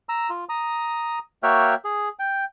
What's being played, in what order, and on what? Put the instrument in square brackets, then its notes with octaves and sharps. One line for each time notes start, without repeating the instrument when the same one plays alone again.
[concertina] A#5 E6
F4
A#5 D#6
A#3 F#4 C#5 E5 G5 F6
G#4
G5